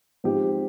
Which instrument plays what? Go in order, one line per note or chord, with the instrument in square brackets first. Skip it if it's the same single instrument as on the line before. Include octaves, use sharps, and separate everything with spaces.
[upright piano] G#2 F3 C4 G4